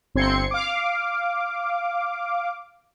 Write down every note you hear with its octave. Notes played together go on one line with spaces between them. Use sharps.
G1 C4 C6 G#6 C#7
F5 D6